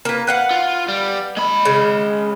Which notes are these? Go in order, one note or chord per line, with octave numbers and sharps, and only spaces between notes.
A#3 B4
B4 F5 F#5
F4
G3
G#3 B5
C#3